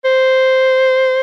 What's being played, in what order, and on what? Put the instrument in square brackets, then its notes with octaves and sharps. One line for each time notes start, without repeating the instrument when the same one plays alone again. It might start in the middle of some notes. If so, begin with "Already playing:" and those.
[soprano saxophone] C5